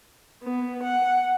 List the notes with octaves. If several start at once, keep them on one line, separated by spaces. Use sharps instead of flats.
B3
F#5